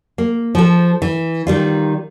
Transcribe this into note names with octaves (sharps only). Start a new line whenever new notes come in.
A#3
F3 A4
E3
D#3 G3 F4